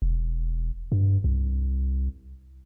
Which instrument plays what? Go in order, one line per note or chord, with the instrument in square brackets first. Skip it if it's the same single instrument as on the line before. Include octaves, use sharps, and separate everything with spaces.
[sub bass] E1
G2
C2